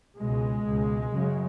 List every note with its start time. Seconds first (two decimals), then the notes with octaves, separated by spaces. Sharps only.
0.18 C#2 B2 G#3
0.65 C#2 B2
1.12 F#2 C#3